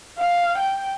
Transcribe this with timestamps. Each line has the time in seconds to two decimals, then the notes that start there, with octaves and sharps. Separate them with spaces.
0.18 F5
0.58 G5